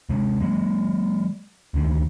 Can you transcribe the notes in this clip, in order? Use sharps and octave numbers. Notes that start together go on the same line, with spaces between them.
C3 G#3
F#3 G#3 A#3
D2 D3 D#3